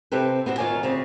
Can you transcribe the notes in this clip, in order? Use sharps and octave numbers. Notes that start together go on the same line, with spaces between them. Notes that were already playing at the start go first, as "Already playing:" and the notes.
C3 C4 G4 A4 B4
B3 C4 D4 F#4
D2 D#3 F4 C#5 D5 G#5
D2 C#3 C4